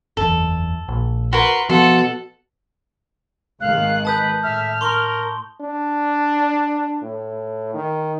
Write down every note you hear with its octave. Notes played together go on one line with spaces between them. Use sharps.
F#1 E2 A4
A#1
F#4 A#4 B4 C6
B2 F3 A4 F#5 C6
G#1 D#3 G#3 F5 F#6
B4 A5 D#6 G6
A2 E5 F6
A#4 C6 C#6 G7
D4
A2
D#3